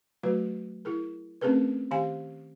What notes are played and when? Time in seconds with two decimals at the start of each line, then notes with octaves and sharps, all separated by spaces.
0.23 F#3 A3 F#4 B4
0.85 E4 G#4 A#4
1.41 A3 C4 C#4 G#4 A#4 B4
1.91 D#3 G4 F5 G#5